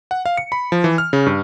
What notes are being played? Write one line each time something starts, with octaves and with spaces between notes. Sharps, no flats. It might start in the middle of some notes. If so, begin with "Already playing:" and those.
F#5
F5
C#7
B5
F3
E3
F6
C#3
G2